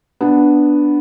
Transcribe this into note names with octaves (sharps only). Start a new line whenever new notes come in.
B3 D4